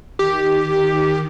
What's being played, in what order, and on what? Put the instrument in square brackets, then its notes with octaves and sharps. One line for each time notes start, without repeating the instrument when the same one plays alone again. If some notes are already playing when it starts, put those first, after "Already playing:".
[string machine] D#3 [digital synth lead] G4